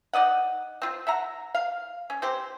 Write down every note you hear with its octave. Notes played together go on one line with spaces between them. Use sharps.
D#4 D5 D#5 F#5
C4 F4
E5 F#5 A#5
F5
C#4
C4 G4 C5